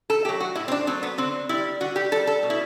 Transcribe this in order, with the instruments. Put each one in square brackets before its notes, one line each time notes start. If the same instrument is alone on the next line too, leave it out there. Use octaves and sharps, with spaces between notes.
[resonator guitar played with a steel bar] A4
A3 G4
F#3
F#4
A2 E4
C4
D4
F#3 A3 C4
B3
D3 C4
G3 E4
D3 F#4
G4
G3 A4
A4
B2
E4